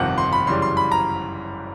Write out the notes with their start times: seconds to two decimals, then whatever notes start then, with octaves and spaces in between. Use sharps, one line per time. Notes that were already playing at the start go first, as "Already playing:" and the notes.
Already playing: G1 F2 C3 D#3 F#5
0.18 C6
0.33 B5
0.47 F#2 C#3 E3 G3 C6
0.62 C6
0.77 B5
0.92 A#5